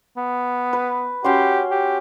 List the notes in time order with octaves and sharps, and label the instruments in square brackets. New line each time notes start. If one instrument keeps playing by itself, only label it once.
[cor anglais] B3
[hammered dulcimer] B4
[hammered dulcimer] C#4 F#4 C6 [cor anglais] G4
[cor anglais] G4